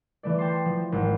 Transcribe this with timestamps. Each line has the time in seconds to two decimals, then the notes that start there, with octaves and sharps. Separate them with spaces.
0.23 E3 A3 D5
0.38 G5 A5 C6
0.65 F3
0.92 G#1